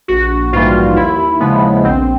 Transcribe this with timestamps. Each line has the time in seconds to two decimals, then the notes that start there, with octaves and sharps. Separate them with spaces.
0.08 A#1 F#4
0.52 G#2 E3 G3 A#3 F4
0.96 D#2 E4
1.40 C#3 F3 G#3 B3
1.84 A#1 C4